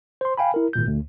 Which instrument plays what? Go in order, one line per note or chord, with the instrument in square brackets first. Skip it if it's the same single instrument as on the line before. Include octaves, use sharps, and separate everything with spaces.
[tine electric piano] C5 C6
F5 G5 G#5 B5
E4 A#4
G#1 A#2 G6
D2